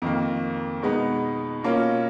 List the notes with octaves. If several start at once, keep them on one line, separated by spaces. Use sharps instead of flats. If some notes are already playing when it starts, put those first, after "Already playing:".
F2 D#3 A#3
B2 G#3 B3 D#4
B2 A#3 C#4 F4